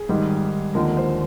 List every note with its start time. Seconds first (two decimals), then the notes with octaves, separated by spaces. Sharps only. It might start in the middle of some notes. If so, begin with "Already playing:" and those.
Already playing: G#4
0.09 G#2 D#3 G3
0.74 D#2 D3 F3 G#3 A#4
0.97 C5